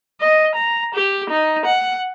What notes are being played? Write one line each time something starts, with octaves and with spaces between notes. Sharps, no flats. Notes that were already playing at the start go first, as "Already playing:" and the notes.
D#5
A#5
G4
D#4
F#5